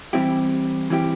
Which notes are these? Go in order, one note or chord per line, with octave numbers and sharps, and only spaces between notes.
E3 G3 C4 E4 G4
E3 G3 C4 E4 G4